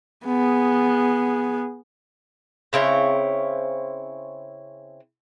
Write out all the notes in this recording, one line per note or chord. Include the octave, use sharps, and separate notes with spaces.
B3 G#4
C#3 C4 E4 C#5